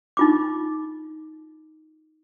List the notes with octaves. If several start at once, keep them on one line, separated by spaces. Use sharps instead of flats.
D#4 F4 D6